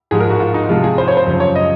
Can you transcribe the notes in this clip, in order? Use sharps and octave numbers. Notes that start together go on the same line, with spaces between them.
G#2 F3 G#3 G#4
A#4
F#4
F4
D#4
C3 F3 G#3 F4
G#4
C5
C#5
C5
F#2 C#3 F3
C#5
D#5